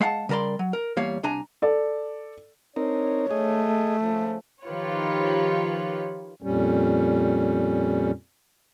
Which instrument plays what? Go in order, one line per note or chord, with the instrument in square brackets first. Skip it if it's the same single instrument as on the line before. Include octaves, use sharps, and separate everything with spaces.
[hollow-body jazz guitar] G#3 F5 F#5 A5
C#3 G3 A#4 D5 C6
F#3
A#4
E2 G3 A#3 C#5 F5
C2 D4 G#5 A#5
[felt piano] A4 D5
[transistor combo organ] C4 D#4 A#4 [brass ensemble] D4 C#5
[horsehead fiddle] A3 [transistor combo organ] G#4 D#5
[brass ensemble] G#2 C#3 F3
[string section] D#3 F3 F4 G4 B4 C#5
[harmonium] F2 A#2 G3 C#4